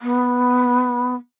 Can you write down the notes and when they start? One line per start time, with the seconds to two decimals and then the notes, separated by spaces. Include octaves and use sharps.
0.01 B3